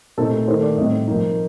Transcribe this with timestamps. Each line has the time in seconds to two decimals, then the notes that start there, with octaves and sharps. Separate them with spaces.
0.18 A#2 A3 C4 D#4 A4
0.33 A4
0.48 D#3 A3 D#4 C5
0.62 D5
0.78 A2 G3 C4 D#5
1.07 F3 A#3 D#4